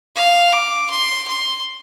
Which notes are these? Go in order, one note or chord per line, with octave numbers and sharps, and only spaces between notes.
F5
D6
C6
C6